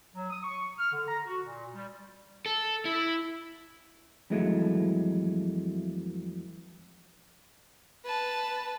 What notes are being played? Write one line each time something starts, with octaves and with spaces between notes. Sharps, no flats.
F#3
D#6
C#6
F6
D3
A#5
F#4
A#2
G3
A4
E4
F2 E3 F#3 G#3 A3
B4 A5